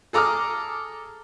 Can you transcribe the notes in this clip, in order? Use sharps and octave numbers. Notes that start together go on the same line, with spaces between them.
G#4 A4 A#5 D6 D#6 F6